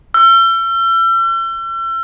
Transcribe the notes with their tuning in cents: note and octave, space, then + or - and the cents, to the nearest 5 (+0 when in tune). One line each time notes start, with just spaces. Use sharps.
E6 +40